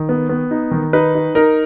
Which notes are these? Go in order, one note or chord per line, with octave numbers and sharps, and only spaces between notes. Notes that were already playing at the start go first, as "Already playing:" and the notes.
Already playing: D#3
B3
B3
D#4
D#3
D#4 B4
D#4
D#4 A#4